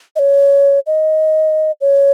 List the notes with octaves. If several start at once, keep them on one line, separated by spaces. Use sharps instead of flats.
D#5
C#5
D#5
C#5